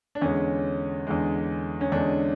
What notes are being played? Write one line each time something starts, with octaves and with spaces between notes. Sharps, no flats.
D4
E2 D3 G#3 C#4
E2 D3 G#3
C#4
E2 D3 G#3 D4